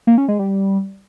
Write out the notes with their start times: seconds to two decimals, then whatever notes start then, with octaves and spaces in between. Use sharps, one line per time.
0.07 A#3
0.18 C#4
0.28 G#3
0.39 G3